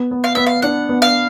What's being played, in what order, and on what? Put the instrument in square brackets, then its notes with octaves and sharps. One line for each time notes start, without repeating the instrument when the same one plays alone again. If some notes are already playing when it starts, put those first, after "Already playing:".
Already playing: [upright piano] B3
B3
[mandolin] F5
[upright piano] B3 [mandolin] E5
[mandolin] F5
[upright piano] D4 [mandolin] F#5
[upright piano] B3
[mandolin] F5